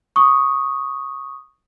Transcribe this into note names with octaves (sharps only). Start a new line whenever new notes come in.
C#6 D#6